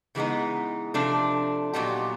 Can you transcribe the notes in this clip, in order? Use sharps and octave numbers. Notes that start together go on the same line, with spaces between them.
C#3 E3 G#3 B3 D#4
C3 F3 A3 D4
A#2 F#3 B3 D#4 G4